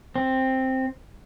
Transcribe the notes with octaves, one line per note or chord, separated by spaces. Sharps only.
C4